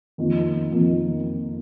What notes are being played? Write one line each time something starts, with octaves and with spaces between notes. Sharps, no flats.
F2 D#3 A#3 F4
F2 D#3 A#3 F4